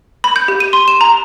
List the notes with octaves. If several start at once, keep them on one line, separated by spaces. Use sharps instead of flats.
B5
G6
G4
D#7
C6
E7
A#5